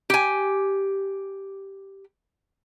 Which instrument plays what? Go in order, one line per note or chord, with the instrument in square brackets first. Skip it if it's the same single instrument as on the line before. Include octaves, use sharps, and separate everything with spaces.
[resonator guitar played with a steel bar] G4 G#5